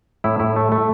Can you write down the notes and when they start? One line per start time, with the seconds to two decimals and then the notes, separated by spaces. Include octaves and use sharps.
0.24 A2 E4
0.39 A2 E4
0.56 A3
0.72 A3